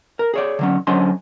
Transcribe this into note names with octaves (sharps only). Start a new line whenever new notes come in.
A#4
G#4 C#5 D5
D3 F#3 C#4
D3 F#3 C#4 C5 D#5 C6